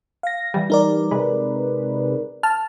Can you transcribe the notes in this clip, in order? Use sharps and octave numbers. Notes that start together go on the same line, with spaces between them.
F5 A#6
E3 G3
D#4 A#4 D5
C3 G#3 B4
A5 F6